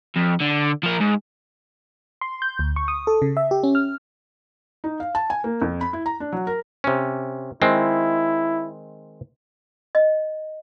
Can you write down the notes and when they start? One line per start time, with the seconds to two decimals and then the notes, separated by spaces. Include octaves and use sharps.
0.16 F2
0.41 D3
0.83 F3 A#4
1.00 G#2
2.21 C6
2.42 G6
2.59 D2
2.76 C#6
2.88 D#6
3.07 A4
3.22 C#3
3.37 E5
3.51 G4
3.63 C#4
3.75 F6
4.84 D#4
5.00 F5
5.15 A5
5.30 G#5
5.44 A#3
5.62 F2
5.81 B5
5.93 E4
6.06 A#5
6.20 D4
6.33 F#3
6.47 A#4
6.84 C3 C#4
7.62 D#3 G#3 C4 E4
9.95 D#5